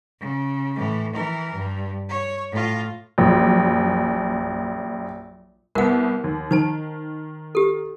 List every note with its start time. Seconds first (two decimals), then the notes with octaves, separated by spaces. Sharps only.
0.20 C#3
0.75 A2 E3
1.14 E3 A#4
1.55 G2
2.09 C#5
2.52 A2 F4
3.18 A#1 F#2
5.75 C2 B3 A#4 F#5
6.24 D#2
6.51 D#3 D#4 C5 A5
7.55 G4 A4